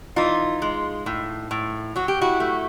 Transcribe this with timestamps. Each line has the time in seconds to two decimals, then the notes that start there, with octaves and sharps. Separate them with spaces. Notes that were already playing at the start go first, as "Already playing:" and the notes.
0.16 E3 D#4 F4
0.62 G#3
1.06 A2
1.51 A2
1.96 F#3 F#4
2.08 G4
2.21 E4 F#4
2.40 A3